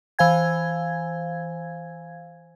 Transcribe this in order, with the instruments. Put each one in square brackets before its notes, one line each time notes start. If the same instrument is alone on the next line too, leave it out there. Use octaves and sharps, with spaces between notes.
[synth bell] E3 C5 F5 G#5 G#6